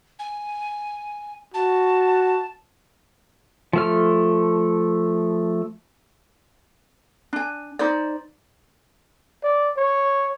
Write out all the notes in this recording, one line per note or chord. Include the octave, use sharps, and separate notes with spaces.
G#5
F#4 A5
F3 A3 F6
D4 G#5
D#4 C5 D5
D5
C#5